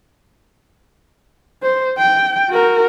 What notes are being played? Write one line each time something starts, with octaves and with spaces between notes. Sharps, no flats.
C5
G5
F#4 A#4